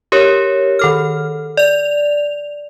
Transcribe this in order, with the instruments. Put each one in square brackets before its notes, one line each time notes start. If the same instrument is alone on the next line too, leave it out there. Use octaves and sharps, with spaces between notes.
[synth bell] G4 A#4 C#5
D#3 A4 F6
D5 F7